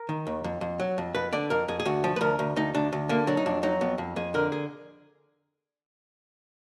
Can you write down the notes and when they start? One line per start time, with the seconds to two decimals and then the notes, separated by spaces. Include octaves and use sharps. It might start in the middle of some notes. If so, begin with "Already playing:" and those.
Already playing: A#4
0.09 D#3
0.27 D#2
0.44 F2
0.61 F2
0.80 F#3
0.98 F2
1.15 F2 B4
1.33 D3 D5
1.50 F2 A#4
1.68 F2 G#4
1.80 G#4
1.86 D2 F#4
2.04 F3
2.16 B4
2.21 D2 A#4
2.39 D2
2.56 D2 D#4
2.74 D2 D4
2.93 D2
3.09 D3 A#3
3.27 F#3 D4
3.37 D#4
3.46 F2 D4
3.63 F#3 D#4
3.81 F2 B3
3.98 F2
4.16 F2 G#4
4.34 D3 A#4
4.52 G#4